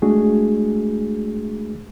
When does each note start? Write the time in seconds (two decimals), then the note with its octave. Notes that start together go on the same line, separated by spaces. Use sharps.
0.02 G#3 A3 D4 F#4 G#4